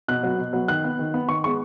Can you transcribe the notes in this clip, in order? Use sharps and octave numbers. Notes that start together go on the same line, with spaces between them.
B2 F#6
F#3 B3
B2
F#3 B3
D#3 F#6
B3
D#3
B3
D#3 C#6
G#3 B3 C#6